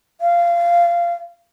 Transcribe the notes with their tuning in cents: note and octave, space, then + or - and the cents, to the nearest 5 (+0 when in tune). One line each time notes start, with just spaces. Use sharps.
F5 -20